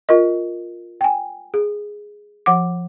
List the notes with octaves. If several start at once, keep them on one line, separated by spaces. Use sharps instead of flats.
F4 A#4 D#5
G5 G#5
G#4
F3 F#5 D6